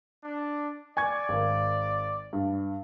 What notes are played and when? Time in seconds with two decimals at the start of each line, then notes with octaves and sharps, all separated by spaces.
0.24 D4
0.97 D5 G#5 C#6 G#6
1.29 G#1 A#4
2.33 G2